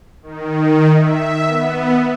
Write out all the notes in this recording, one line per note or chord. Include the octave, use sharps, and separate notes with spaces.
D#3
E5
B3